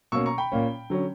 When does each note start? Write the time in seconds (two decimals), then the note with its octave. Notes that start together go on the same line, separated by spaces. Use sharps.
0.12 B2 A#3 C#4 C#6 E6
0.26 A#5 C#6
0.38 G5 B5
0.52 A#2 A#3 C#4
0.90 D3 F#3 C#4